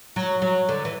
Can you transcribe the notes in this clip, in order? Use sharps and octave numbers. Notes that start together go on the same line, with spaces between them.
F#3
F#3
D3
E3